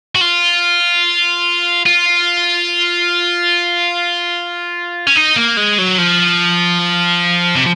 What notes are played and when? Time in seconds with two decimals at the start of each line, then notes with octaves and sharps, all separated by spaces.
0.15 F#4
0.21 F4
1.86 F4
5.07 C#4
5.16 D#4
5.36 A#3
5.57 G#3
5.78 F#3
5.98 F3
7.56 C3